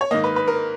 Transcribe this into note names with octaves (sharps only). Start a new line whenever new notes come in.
C#5
G#2 D#3 A#3 D#5
B4
B4
A#4